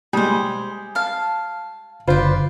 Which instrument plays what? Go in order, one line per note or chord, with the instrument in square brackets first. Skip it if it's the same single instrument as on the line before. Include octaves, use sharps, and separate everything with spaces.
[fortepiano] G3 G#3 [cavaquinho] G#4 C5
[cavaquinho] F5 A5
[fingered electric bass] F#1 D3 [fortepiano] F4 C5 [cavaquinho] B4 D5